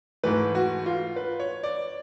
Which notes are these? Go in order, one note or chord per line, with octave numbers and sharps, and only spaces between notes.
G#2 E3 A3 B4
F#4
F4
B4
C#5
D5